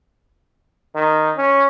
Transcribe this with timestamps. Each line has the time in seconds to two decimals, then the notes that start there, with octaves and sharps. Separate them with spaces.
0.95 D#3
1.37 C#4